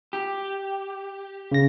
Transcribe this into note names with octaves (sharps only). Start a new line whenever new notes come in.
G4
C#3 A#6